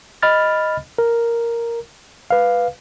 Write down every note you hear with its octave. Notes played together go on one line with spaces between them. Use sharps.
D#5 B5 F6 A6
A#4
B4 F5